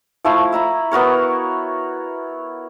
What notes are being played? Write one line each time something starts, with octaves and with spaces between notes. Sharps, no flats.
F3 A3 E4 F5
E5 A#5 B5
B3 F#4 A#4 C#5